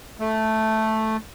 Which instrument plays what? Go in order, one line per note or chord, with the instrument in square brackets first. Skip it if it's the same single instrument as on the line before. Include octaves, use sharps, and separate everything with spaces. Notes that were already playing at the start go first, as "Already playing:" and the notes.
[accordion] A3